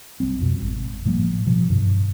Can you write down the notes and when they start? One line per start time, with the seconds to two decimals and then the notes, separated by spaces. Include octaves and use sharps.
0.20 B1 G3 C4
0.39 F2 B2
0.61 G#1
1.05 A2 F3 G3 A#3
1.47 B2 F3
1.70 G2 B2 D#3